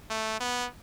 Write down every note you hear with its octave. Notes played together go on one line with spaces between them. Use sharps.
A3
B3